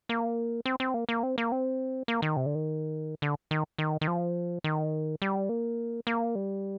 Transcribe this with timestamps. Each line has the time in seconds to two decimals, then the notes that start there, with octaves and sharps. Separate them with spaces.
0.09 A#3
0.65 C4
0.80 C4
0.94 A#3
1.09 A#3
1.23 C4
1.38 A#3
1.52 C4
2.08 A#3
2.22 D#3
2.37 C3
2.46 D3
2.55 D#3
3.22 D3
3.51 D#3
3.78 D#3
4.01 D#3
4.07 F3
4.64 D#3
5.22 G3
5.49 A#3
6.07 A#3
6.35 G3